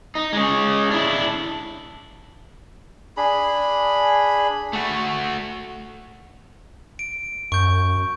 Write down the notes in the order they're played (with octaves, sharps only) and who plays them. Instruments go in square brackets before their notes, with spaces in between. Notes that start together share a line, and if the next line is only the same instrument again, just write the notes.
[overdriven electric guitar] D#4
G#3 C#4
D4 E4
[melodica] D4 G#4 B5
[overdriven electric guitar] A3 F#4
[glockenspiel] D7
[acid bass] F#2 [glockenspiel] C#6 G6